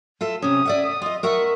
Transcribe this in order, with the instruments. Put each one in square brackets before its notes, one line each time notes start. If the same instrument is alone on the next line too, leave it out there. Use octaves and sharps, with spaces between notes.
[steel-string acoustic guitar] F4 A4 E5
[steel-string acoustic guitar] C3 C#4 [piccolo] D#6
[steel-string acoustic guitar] D5 E5 F#5
F4 D#5
[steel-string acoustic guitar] A#4 E5 F#5 [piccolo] C#6